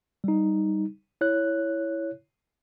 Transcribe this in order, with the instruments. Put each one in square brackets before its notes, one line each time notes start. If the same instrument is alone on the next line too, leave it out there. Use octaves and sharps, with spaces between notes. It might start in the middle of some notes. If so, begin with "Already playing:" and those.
[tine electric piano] G3 D#4
E4 C#5 F#6